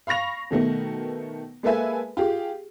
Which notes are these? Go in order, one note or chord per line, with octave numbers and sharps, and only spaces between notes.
F5 B5 C#6 A#6 F7
B2 D#3 A3 B3
G#3 A#3 A4 B4 E5 G#5
F4 G4 G#4